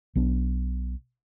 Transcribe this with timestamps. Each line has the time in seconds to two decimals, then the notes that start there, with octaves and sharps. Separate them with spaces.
0.15 B1 B3 D4